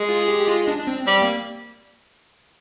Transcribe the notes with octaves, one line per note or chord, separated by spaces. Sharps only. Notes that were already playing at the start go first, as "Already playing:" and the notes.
Already playing: G#3
F4
G#4
G4
G4
F4
D4
D4
C4
G3 C4
A#3